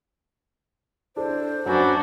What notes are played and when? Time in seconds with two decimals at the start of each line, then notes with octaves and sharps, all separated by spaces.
1.17 D4 E4 A4 C5
1.65 F#2 F#3 D4 F#4 B4 G#5